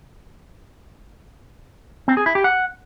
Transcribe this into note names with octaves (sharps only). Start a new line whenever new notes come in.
C4
G#4
E4
G4
F#5